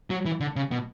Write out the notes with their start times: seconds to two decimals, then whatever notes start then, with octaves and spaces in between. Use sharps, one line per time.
0.10 F#3
0.25 E3
0.40 D3
0.56 C#3
0.72 B2